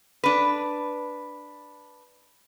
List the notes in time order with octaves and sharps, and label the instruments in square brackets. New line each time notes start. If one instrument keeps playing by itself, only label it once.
[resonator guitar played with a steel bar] D4 B4